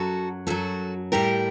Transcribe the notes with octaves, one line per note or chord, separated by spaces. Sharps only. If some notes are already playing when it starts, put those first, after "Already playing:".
Already playing: F#2 F#3 F#4 A4
F#2 F#3 F#4 A4
A2 G3 G4 A#4